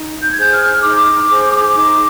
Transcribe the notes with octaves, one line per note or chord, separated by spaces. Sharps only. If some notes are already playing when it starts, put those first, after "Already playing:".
Already playing: D#4
G6
G#6
G#4 C5 G6
F6
D#4 D6
G#4 C5
D#4 D6